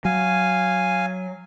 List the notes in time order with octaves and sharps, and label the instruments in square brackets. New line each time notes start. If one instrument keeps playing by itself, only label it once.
[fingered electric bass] F#3 [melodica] F5 G#5